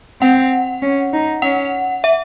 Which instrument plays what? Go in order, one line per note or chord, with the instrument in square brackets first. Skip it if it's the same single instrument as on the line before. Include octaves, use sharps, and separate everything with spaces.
[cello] C4 [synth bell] F#5
[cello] C#4
D#4
[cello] C#4 [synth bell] F#5
[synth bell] E5